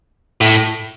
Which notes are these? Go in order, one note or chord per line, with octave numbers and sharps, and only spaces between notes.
A2